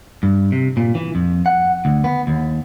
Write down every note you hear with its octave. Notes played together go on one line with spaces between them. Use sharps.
G2
C3
A#2
E3
F2
F#5
D2
B3
D#2